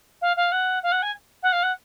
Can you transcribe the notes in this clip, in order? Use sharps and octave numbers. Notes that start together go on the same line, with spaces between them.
F5
F5
F#5
F5
F#5
G#5
F#5
F5
F#5